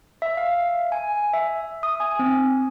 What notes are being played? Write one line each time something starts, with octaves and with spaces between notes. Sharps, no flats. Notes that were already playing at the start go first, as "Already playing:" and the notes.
E5
F5
G#5
E5
D#6
G#5
C4